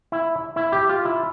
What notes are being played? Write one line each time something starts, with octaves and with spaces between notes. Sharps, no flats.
E4
E4
G4
F4
E4